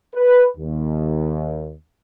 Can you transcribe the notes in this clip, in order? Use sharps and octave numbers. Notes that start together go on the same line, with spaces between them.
B4
D#2